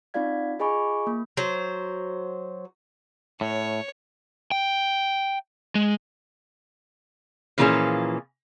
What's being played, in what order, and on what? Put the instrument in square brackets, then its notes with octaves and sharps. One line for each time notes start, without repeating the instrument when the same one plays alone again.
[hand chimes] C4 D#4 F4 D5 F5 G#6
F4 G#4 D#5 G#5 B5 C#6
A#3
[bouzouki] F#3 C5
[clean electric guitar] A2 [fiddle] C#5
[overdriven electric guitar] G5
G#3
[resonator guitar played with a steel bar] A#2 E3 F3 A#3 C#4 G#4